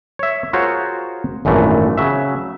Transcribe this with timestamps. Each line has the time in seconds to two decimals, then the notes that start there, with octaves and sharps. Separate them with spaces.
0.19 C#5 E5
0.53 F4 F#4 G#4 A#4 C5 C#5
1.45 G#1 F#2 A#2 E3 A3
1.97 C#3 F#3 E5